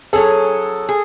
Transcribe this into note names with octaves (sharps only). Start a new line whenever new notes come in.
F#3 C#4 G#4 A4
G#4